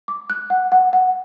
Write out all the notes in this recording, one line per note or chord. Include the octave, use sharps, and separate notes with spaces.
D6
F#6
F#5
F#5
F#5